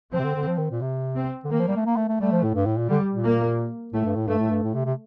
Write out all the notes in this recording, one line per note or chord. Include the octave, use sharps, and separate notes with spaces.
F3 C4
C3
D3
D3
F3
D#3
A#2
C3
C4
D3
D#3 A#3
F3
G3
A3
A#3
A3
A3
G3 A3
F3
A2
G2
A2
A#2
D3 G3
A#2
A#3
A2 A3
G2
A2
G2 A3
A2
G2
A2
C3
C3